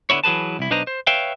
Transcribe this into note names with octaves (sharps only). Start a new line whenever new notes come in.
D3 B3 E4 C#5
E3 F#3 G#4 B4 A5
C2 E4
B1 D4 B4 C5 D#5 A#5
C5
B4 C#5 E5 F5 G5